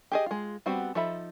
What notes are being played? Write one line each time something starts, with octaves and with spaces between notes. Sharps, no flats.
G4 G#4 D#5
G#3 F4
G3 B3 C4 F#4
F3 D#4 A4 E5 B5